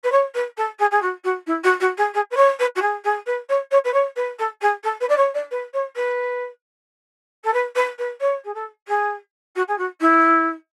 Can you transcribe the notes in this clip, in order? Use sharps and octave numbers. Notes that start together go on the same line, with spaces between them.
B4
C#5
B4
A4
G#4
G#4
F#4
F#4
E4
F#4
F#4
G#4
G#4
B4
C#5
B4
F#4
G#4
G#4
B4
C#5
C#5
B4
C#5
B4
A4
G#4
A4
B4
D5
C#5
D5
B4
C#5
B4
A4
B4
B4
B4
C#5
G#4
A4
G#4
F#4
G#4
F#4
E4